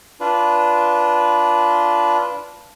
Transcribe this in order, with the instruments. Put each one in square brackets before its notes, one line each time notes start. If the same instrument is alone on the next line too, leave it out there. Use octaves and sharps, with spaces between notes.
[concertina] D4 F4 B4